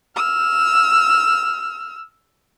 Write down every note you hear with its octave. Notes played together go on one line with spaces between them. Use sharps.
E6 F6